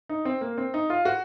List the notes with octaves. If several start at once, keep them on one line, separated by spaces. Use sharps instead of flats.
D#4
C4
A#3
C4
D#4
F4
F#4